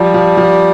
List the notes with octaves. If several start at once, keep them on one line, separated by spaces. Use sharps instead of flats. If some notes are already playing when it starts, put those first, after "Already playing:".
Already playing: F3 G3
F3
F3